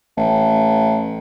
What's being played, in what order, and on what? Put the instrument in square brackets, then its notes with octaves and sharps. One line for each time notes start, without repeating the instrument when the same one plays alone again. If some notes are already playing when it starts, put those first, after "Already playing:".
[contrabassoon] A1